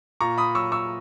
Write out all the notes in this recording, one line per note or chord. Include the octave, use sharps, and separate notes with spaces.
A#2 A#5 C#6
B5 D#6
F#3 C#6 E6
C#6 E6